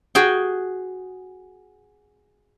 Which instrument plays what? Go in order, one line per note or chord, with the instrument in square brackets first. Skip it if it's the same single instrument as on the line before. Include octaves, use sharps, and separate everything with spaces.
[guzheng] F#4 G#4 G5